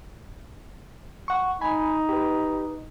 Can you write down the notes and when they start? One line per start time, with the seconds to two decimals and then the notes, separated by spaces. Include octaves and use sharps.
1.28 F#5 C#6
1.61 D#4 G#5 B5
2.09 G4 B4